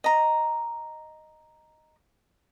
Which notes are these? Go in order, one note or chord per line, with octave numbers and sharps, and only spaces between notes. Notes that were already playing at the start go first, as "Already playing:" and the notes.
D#5 A#5